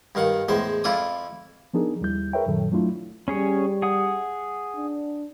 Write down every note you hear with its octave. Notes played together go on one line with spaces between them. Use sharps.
G2 D#3 F5 F#5
E2 A2 G#3 C5
F2 E4 F4 A4 D5 D#6
F3 B3 D4 D#4 G#4 A#4
D#2 G3 E4 G6
G#4 A#4 B4 C#5 E5 G5
F#2 A#2 D#3 F#3 A4
F#3 A3 D4 E4 F4
G3 C#4 G#4 C#5
G#4 F#5 D#6
D4